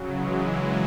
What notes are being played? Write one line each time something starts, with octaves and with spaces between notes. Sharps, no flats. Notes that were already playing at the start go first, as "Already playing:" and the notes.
Already playing: C#3 F#3
E3 G#3
E3 G#3